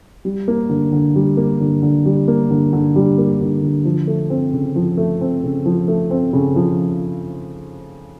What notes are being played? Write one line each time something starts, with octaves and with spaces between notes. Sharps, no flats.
G3
A#3
D3
D3
G3
A#3
D3
D3
G3
A#3
D3
D3
G3
A#3
D3
D3
F3
A3
C4
C#3
F3
A3
C4
C#3
F3
A3
C4
C#3
F3